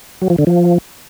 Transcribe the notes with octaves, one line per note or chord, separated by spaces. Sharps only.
F#3
F3
D3
F3